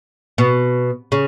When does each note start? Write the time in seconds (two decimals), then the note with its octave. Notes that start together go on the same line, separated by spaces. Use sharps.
0.38 B2
1.12 C#3